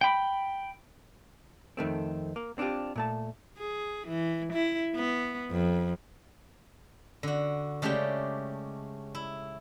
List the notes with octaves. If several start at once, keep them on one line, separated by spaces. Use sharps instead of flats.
G5 B5
F2 D#3 A3 C4
A#3
C4 D4 D#4 F4 G4
A#2 A3 A5
G#4
E3
E4
B3
F2
D3 F#4
C#3 G#3 A3 G4 D5 A5
E4